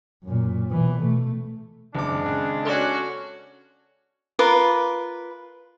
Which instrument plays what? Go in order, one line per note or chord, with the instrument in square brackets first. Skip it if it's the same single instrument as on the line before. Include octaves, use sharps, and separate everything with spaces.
[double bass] F#2 A#2
B2 E3
A3
[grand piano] F#1 D6 [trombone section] G#3 C4 D4
[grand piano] C#3
[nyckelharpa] C#4 F#4 [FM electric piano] A4 D5
[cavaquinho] F4 A#4 B4 D6